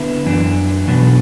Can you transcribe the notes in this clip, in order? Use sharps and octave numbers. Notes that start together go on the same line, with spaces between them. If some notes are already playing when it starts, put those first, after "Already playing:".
Already playing: D3 B3 E4
F#2 E3 D4
B2 F#3 B3 D4 F#4